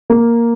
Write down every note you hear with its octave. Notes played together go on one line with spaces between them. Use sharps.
A#3